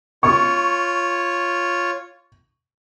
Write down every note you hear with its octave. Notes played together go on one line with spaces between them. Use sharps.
F4 C#5 C#6